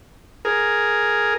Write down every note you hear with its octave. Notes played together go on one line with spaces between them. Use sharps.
G#4 A#4